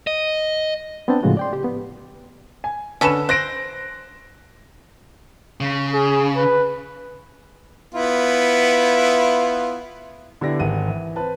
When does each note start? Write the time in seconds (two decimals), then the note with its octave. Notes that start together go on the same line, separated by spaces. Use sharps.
0.07 D#5
1.08 B3 C4 D4 G5 A5
1.23 A2 C#3 F3 G#3 F4 F#4
1.37 D5 G5 C6
1.53 G4
1.64 B3
2.64 G#5
3.01 D3 C#4 A4 B4 E7
3.29 C5 F#6 A#6 D7
5.61 C#3
5.93 G#4
6.36 B4
7.95 B3 E4 F4
10.41 D3 B3 E4 G4 D5 A#6
10.60 G#1 F#5 D#7
10.88 E3
11.16 C4 B4 A5